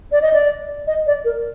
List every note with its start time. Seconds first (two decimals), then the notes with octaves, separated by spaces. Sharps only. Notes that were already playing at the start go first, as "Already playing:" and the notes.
0.12 D5
0.22 D#5
0.33 D5
0.87 D#5
1.07 D5
1.25 A#4